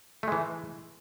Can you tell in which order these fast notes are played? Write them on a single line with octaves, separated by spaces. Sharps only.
A3 G#3 E3